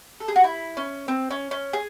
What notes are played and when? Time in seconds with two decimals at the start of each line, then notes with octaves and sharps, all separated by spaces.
0.20 A4
0.28 G#4
0.36 F#4
0.44 E4
0.77 C#4
1.08 C4
1.31 C#4
1.51 C#4
1.73 G#4